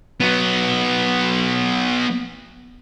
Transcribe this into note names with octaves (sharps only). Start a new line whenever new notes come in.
F#3 B3